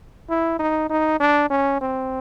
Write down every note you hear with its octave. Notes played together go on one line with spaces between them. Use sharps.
E4
D#4
D#4
D4
C#4
C4